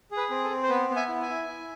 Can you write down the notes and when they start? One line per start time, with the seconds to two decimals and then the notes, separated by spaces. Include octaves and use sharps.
0.11 G#4
0.17 B4
0.30 C4
0.44 A4
0.50 C4
0.63 C5
0.69 B3 B4
0.90 B3
0.96 E5 G#5
1.08 E4
1.22 E5 G#5
1.29 E4
1.48 E4